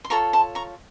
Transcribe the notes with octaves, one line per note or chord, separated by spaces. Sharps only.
C6
F4 A4 C#5 A#5 C#6
A5 C6
A#5 C#6